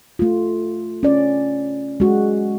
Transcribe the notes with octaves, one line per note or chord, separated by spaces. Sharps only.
A3 F4
C#4 D5
G#3 F#4